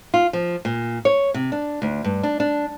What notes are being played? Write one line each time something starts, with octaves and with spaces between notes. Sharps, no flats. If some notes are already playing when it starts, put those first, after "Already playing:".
F4
F3
A#2
C#5
C3
D4
D2
G2
D4
D4